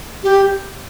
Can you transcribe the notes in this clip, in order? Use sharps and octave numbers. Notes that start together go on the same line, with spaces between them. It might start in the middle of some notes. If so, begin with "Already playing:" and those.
G4